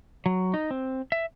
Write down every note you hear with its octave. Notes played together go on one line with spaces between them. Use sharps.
F#3
D#4
C4
E5